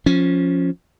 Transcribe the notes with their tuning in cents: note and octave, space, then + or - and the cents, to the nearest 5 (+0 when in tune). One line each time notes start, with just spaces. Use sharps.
F3 +10 C#4 +0